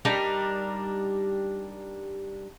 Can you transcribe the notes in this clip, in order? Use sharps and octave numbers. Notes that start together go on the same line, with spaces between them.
G3 D4 D#4 A#4